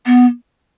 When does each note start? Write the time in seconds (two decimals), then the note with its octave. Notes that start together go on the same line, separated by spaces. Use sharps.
0.06 B3